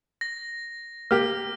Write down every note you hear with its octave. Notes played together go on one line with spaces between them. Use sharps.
A#6
A#3 G4 F6